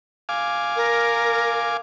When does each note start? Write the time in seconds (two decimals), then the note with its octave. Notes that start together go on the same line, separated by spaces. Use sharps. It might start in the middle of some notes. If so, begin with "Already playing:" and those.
0.29 F5 G#5 D6
0.76 A#4